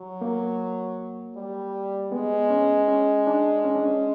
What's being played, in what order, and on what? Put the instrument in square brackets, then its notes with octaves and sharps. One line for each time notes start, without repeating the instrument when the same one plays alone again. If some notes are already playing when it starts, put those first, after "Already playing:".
Already playing: [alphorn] F#3
[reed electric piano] A#3
[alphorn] G3
[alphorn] G#3 [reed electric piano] B3
[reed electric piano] C#4
C#4
D4
C#4
D4
C#4